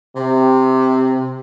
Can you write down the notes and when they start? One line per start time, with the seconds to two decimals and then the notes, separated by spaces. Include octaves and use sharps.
0.15 C3